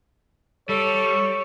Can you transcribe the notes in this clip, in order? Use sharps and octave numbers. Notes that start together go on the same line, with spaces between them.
G3 A4 C#5 C#6